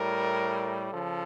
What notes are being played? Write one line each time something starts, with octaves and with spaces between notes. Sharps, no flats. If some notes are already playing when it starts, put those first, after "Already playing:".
Already playing: A2 G3 A#4
C#3 F3 A4